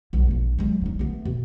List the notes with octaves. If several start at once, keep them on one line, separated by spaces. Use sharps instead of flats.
B1 G3
A#1 A#3
F#3 G#3
G2 D#4
A3 B3
B2